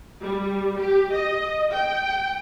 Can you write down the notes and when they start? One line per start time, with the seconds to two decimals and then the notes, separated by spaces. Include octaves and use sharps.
0.21 G3
0.78 G4
1.11 D#5
1.71 G5